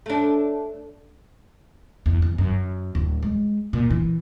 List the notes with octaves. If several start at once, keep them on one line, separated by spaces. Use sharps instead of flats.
A3 D4
E2
E2
F#2
D1
G#3
A#2
E3